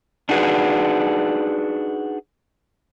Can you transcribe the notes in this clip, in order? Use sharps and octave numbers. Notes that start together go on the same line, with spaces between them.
D4 D#4 F#4 G#4 B4